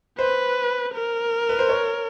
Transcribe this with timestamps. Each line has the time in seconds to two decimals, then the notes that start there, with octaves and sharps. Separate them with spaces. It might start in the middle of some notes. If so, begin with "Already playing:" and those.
0.18 B4 C5
0.94 A#4
1.49 B4
1.59 C5
1.69 C#5